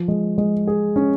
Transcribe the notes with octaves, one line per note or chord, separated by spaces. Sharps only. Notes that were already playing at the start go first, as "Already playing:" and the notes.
Already playing: F3
G#3
G#3
G#4
C#4